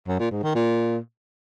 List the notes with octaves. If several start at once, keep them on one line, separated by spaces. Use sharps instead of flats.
F#2
A#2
G#2
D#3
A#2